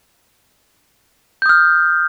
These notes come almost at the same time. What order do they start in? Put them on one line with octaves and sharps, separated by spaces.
G6 D#6 F6